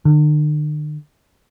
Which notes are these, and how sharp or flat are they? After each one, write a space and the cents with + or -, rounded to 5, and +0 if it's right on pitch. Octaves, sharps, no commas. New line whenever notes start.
D3 +45